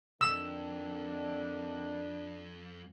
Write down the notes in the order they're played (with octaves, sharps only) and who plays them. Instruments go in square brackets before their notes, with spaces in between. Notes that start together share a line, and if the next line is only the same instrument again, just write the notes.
[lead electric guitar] C2 F2 [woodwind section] D3 D#3 C4 [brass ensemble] D4 [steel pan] E6